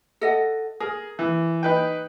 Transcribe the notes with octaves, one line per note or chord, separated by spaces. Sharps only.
A4 D#5 F#5
G#4 A#4
E3
D#4 B4 G5